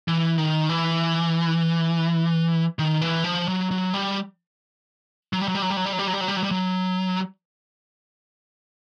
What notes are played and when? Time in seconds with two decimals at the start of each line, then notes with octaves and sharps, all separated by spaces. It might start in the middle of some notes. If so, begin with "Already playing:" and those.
0.08 E3
0.38 D#3
0.69 E3
2.79 D#3
3.01 E3
3.24 F3
3.48 F#3
3.71 F#3
3.94 G3
5.33 F#3
5.41 G3
5.48 F#3
5.55 G3
5.62 F#3
5.70 G3
5.77 F#3
5.85 G3
5.93 F#3
5.99 G3
6.07 F#3
6.14 G3
6.21 F#3
6.28 G3
6.37 F#3
6.43 G3
6.51 F#3